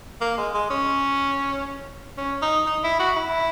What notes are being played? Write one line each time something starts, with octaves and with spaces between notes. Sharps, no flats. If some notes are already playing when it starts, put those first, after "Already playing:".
A#3
G#3
G#3
C#4
C#4
D#4
D#4
E4
F#4
E4